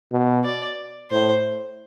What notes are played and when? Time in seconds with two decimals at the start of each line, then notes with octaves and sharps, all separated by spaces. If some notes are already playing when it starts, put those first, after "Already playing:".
0.12 B2
0.44 D5
1.11 A2 C5